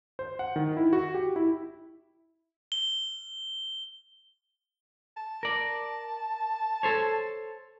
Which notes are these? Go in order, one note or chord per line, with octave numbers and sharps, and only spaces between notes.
C5
F#5
D#3
E4
F#4
G4
E4
G7
A5
A#4 D5
A4 C5 C#5